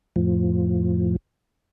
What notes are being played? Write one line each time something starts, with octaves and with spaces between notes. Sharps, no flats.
F2 A2 F3